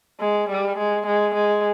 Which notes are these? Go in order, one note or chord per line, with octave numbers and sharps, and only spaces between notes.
G#3
G3
G#3
G#3
G#3